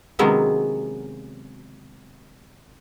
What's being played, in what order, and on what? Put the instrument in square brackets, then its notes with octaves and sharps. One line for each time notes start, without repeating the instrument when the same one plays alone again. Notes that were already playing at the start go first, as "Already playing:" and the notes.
[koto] C3 D#3 F#3 G#3 B3 C#4